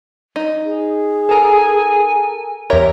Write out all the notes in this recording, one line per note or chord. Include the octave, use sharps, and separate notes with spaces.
D#4
G#4
A4 A#4 G#5
E2 G4 A#4 C#5 E5